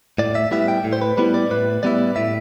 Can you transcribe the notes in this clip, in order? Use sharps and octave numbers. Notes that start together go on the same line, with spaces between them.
A2 D5
E5
G3 B3 E4 E5
G5
A2
C5
B4
G3 B3 E4 B4
D5
A2 B4
G3 B3 E4 D5
A2 E5